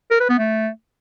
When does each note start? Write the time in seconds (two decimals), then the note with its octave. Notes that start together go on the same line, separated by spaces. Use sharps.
0.11 A#4
0.20 B4
0.30 B3
0.39 A3